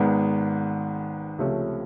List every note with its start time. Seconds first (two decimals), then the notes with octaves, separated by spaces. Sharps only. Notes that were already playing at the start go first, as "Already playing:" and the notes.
Already playing: G#1 G#2 D#3 G#3 B3
1.39 C#2 C3 F3 A3 C#4